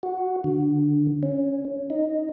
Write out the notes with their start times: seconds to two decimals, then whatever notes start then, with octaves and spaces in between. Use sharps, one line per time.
0.03 F#4
0.44 D3
1.23 C#4
1.90 D#4